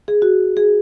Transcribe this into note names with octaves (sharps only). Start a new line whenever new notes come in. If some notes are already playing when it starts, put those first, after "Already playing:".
G#4
F#4
G#4